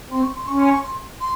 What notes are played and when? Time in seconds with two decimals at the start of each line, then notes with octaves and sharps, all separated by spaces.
0.10 C4 C6
0.22 C#6
0.35 C6
0.47 C#4 C#6
0.59 C6
0.71 C#6
0.83 C6
1.20 C6